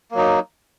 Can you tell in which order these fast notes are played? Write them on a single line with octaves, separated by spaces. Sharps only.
A#3 F#3 D#4